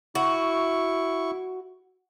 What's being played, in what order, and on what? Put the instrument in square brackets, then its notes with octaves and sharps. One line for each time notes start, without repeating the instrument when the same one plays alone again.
[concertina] E4 C#6 [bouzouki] F#4